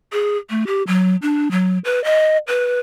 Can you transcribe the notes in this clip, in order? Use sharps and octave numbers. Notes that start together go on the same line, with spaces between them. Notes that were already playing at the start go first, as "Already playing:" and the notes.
G#4
A3
G4
F#3
D4
F#3
B4
D#5
B4